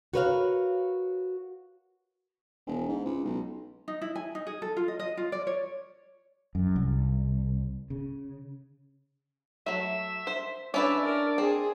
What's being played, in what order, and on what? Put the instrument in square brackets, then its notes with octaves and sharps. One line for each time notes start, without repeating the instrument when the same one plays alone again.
[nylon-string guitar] F#4 A#4 B4 C#5 D#5 F5
[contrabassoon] E1
G#2
C#2
B1
[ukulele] D#4
E4
G#5
D#4
G#4
A4
F4
D#5
D#5
F4
D5
C#5
[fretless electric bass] F#2
C2
C#3
[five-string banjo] F#3 A3 [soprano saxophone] E5
[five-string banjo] C5
[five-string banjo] C#4 E4 B4 [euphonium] D4 [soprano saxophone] D5 [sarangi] E5
[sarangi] A#4
[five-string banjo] C4 [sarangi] G#4